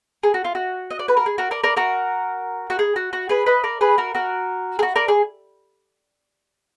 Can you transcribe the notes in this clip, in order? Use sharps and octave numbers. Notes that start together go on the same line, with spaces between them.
G#4
F#4
F4
F#4
D#5
D5
B4
A#4
G#4
F#4 A#4
A#4 D5
A#4 D5
F#4 A#4
F#4
G#4
F#4
F#4
G#4 B4
B4 D#5
A#4 D5
G#4 B4
F#4 A#4
F#4 A#4
G#4
F#4
A#4 D5
G#4